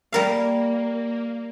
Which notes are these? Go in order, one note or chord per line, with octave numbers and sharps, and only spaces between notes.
G3 A#3 A#4 F5